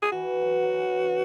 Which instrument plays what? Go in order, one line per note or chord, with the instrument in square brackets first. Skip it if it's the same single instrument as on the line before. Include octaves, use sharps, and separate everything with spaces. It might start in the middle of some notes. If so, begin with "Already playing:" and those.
[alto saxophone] G#4
[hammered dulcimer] E3 [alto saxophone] F#4
[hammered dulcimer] F#3
F#3
E3
C#3